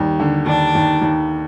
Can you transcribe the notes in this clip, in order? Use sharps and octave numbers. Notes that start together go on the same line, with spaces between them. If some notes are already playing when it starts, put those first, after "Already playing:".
Already playing: D#2 G3
D3
D#2 D4
D#2
D#2